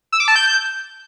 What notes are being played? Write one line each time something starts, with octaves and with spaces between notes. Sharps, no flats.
E6
D6
A5
G6